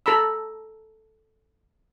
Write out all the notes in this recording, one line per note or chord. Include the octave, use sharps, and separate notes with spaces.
A4 A#5 B5 E6